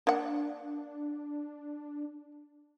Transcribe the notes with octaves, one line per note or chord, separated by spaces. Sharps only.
A#3 D4 F#5